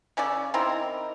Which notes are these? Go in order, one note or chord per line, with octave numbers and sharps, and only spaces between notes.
C#3 C#4 A4 D5
D#3 C4 E4 A#4